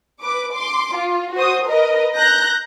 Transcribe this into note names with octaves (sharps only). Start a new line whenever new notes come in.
B4 D6
C6 D6
F4
F#4 C5 D#6
A#4 B4 D#5
A#5 F#6 G6 A#6